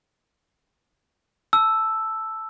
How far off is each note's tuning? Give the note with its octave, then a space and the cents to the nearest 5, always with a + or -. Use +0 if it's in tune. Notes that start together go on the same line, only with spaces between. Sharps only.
A5 +0 E6 +0